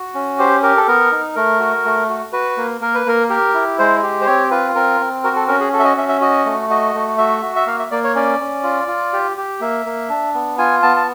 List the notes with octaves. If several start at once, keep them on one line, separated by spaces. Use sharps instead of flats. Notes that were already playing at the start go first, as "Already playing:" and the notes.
Already playing: F#4
C#4
G4 C5
G4 A#4
A4
B3 A#4
D#4
A3 A#4
F#4
A3
F#4
F#4 B4
A#3
A#3 A#4
B4
A#3 A#4
G4 A#4
E4
G#3 C5
G4
C5
C4 C#5
F4 B4
C4 A#4
C4
F#4 A#4
A4
C#4 A#4
G#4
F#4 A4
E5
D#5
C#4 E5
E5
F#4 D#5
A3
F#4 D#5
A3
F#4 E5
F#4
E5
A#3 F5
E5
A#3 D5
C#5
C#4 D5
C#4
F4
F4
G4
G4
A#3 E5
A#3
D4
B3
F4 G#5
B3 A5
A5